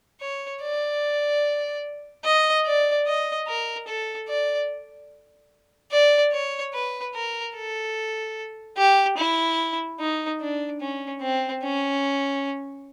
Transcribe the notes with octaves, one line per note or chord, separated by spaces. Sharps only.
C#5
D5
D#5
D5
D#5
A#4
A4
D5
D5
C#5
B4
A#4
A4
G4
E4
D#4
D4
C#4
C4
C#4